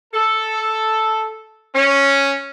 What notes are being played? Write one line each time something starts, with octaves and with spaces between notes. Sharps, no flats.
A4
C#4